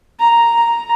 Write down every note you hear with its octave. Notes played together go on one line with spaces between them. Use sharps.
A#5